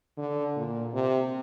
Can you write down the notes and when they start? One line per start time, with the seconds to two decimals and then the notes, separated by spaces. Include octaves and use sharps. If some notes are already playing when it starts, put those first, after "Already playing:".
0.18 D3
0.56 A#2
0.94 C3